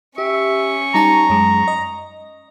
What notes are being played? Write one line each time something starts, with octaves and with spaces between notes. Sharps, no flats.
C#4 G4 E5 C#6
G3 D#4 A5 A#5
F#2 G#3
D#5